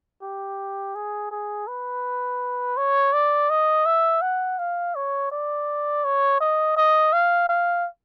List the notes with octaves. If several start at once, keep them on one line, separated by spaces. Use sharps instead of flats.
G4
G#4
G#4
B4
C#5
D5
D#5
E5
F#5
F5
C#5
D5
C#5
D#5
D#5
F5
F5